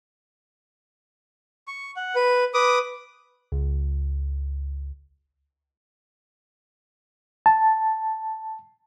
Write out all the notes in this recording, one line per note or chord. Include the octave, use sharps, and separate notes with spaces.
C#6
F#5
B4
B4 D6 D#6
C#2
A5